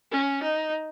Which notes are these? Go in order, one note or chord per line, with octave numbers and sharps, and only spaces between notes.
C#4
D#4